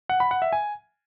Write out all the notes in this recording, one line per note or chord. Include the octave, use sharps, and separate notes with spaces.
F#5
B5
F#5
E5
G#5